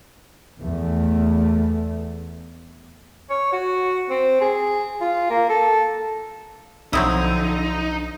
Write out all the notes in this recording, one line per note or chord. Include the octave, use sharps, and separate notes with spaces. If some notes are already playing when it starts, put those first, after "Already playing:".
E2 A3
C#5
F#4
C4
G#4
F4
A#3
A4
B1 D3 F3 F#3 C4 D#4 E4 D#6